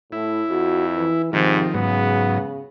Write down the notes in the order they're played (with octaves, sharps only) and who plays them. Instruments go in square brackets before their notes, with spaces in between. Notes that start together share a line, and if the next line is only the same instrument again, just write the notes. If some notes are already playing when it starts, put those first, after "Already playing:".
[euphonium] A2 [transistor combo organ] E4
[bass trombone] F2 [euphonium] F#4
[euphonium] E3
[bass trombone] G#2 [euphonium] C3 [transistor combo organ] D#3 F3
[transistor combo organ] G#2 F#3 [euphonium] C#3 [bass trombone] B3